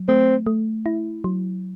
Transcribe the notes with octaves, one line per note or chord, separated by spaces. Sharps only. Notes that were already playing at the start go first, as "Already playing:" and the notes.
Already playing: F#3
A3 C4
A3
E4
F#3